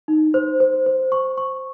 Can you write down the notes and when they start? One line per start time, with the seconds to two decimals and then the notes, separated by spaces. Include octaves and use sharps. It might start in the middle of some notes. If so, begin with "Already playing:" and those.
0.08 D#4
0.34 C5
0.60 C5
0.86 C5
1.12 C#6
1.38 C#6